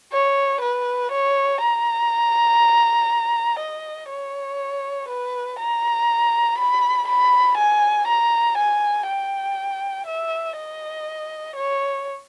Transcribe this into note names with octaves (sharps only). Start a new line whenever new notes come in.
C#5
B4
C#5
A#5
D#5
C#5
B4
A#5
B5
B5
G#5
A#5
G#5
G5
E5
D#5
C#5